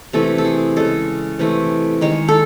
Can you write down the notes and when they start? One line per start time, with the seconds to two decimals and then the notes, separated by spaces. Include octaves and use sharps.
0.13 C3 E3 A3 A4
0.38 A4
0.45 G#4
0.76 C#3 G#3 A4
1.39 C3 E3 A3
2.01 D#3 G#3 C#5
2.28 A4